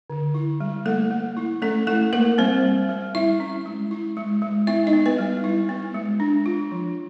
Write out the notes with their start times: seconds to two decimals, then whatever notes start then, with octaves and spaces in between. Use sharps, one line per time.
0.10 D3
0.34 E4
0.61 G3
0.86 A3 A#3 A4
1.11 A#3
1.37 E4
1.62 A3 C#4 A4
1.87 A3 E4 A4
2.13 A3 A#3 A#4
2.38 G3 C4 C5
2.64 G3
2.89 G3
3.15 E4 E5
3.40 C#4
3.66 G#3
3.91 E4
4.17 G#3
4.42 G#3
4.67 B3 E4 E5
4.87 D#4 D#5
4.93 B3
5.06 B3 B4
5.18 G3
5.44 E4
5.69 B3
5.94 G#3
6.20 D4
6.46 F4
6.72 F3